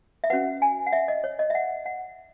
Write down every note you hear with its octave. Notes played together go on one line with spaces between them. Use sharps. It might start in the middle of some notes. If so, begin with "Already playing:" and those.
E5
C#4 F#4 B4 F#5
G#5
F#5
E5
D#5
C#5
D#5
E5
F#5
F#5